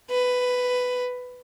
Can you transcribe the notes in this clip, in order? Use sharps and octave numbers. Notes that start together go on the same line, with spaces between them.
B4